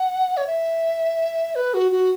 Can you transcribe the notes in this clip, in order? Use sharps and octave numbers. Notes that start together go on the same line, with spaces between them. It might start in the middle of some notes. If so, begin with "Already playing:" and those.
Already playing: F#5
C#5
E5
B4
F#4
F#4